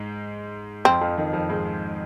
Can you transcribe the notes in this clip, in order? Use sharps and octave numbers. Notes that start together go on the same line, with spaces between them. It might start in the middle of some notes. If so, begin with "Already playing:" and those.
Already playing: G#2 G#3
F2 F3 C4
F2 F3
D#3
F2 F3
G#2 G#3